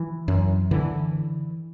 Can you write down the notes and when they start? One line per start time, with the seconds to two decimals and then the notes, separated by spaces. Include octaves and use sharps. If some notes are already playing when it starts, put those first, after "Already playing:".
Already playing: E3
0.28 F#2
0.71 D3 E3